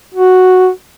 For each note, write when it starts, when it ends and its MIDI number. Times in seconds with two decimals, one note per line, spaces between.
0.14 0.69 66